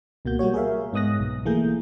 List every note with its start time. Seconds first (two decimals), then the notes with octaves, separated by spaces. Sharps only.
0.25 C#2 B2 A#3 F#4 G6
0.39 G3 A#3 F#4 C#5
0.54 G#4 A#4 C#5 E5 F5
0.93 G#2 B3 D#5 D#6 F#6 A#6
1.20 B1
1.45 E3 A3 A#3 G#4 A#4 G6